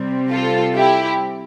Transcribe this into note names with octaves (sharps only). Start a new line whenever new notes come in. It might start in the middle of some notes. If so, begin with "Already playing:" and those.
Already playing: C3 G3 C4
F4 A4
E4 G4